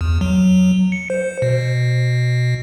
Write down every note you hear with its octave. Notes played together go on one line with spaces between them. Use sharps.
E2
F#3
C#7
C5
B2